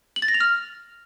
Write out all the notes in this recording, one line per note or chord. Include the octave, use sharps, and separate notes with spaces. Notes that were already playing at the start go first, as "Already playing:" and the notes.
F#7
A6
A#6
F7
F6